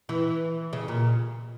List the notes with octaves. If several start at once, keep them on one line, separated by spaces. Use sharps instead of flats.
E3
C#3
A#2